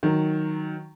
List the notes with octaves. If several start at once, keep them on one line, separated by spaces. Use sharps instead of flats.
D#3 F#3